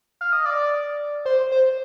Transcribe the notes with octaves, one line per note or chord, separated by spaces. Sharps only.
F5
D#5
D5
C5
C5